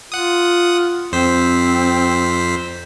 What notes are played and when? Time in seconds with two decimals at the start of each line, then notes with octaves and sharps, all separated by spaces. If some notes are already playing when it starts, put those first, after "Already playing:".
0.12 F4 F#5 D#6
1.12 F2 C4 C5 B6